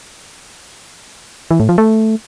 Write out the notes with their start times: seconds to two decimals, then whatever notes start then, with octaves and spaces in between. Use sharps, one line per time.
1.51 E3
1.60 A2
1.69 F3
1.78 A3